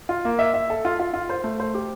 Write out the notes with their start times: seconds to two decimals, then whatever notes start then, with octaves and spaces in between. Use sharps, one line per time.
0.09 F4
0.25 A#3
0.39 E5
0.54 E5
0.70 A4
0.85 F4
0.99 F4
1.14 F4
1.29 C5
1.44 A3
1.60 C5
1.75 G4